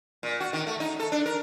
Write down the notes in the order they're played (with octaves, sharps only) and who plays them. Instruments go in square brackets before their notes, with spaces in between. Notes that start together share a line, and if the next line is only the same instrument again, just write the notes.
[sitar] A#2
F#4
D#3
A3
D#4
A4
D4
A#4